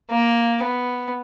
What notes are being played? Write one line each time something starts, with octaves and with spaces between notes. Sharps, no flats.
A#3
B3